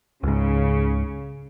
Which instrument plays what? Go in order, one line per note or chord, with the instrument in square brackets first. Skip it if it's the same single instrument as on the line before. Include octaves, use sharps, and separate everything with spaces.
[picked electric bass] C#2 G#2 [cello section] C#3